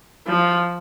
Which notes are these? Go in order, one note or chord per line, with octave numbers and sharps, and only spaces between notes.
F3